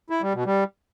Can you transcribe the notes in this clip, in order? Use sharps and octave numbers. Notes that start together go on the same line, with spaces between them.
E4
G3
B2
G3